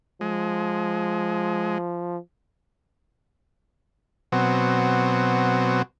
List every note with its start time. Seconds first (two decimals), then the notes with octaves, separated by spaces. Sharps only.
0.21 F3 G#3
4.32 B2 F#3 C4